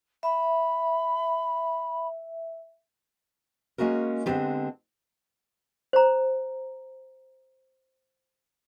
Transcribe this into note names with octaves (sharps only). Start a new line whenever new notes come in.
E5 B5
G#3 A#3 C#4 F#4 A#4
D3 G#3 B3 C4 F4 G4
C5 A#5